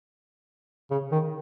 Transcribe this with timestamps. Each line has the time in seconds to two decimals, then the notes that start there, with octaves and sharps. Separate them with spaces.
0.91 C#3
1.12 D#3